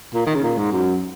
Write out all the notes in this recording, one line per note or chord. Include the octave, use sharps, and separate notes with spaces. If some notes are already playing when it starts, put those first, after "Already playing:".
A#2
D#3
C#3
A#2
G#2
F#2